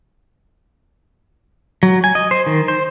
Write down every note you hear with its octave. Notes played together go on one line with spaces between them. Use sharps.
F#3
G#5
D#5
C5
D#3
C5